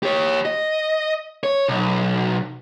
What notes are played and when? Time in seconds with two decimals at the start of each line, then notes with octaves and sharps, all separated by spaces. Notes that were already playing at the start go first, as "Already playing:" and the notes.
0.03 G4 C#5
0.45 D#5
1.43 C#5
1.68 B1